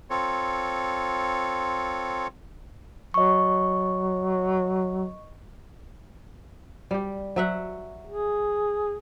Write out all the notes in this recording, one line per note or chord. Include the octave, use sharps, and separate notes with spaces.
C4 F4 A4 C#5
F#3 D#5 C#6
G3 G4
F#3 E5 F#5
G#4